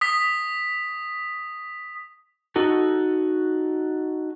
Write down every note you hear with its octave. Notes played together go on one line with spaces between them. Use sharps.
D#6 B6
D#4 F#4 A4